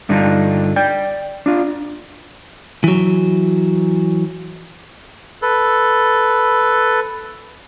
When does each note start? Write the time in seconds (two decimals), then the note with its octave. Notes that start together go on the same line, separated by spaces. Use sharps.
0.09 G2 D3 G3 D4 D#4 F4
0.76 D5 G5
1.46 D4 F4
2.84 E3 F#3
5.42 A4 B4